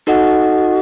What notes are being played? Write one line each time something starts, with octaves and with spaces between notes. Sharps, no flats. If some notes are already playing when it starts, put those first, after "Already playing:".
D#4 F#4 A4 D#5 F#5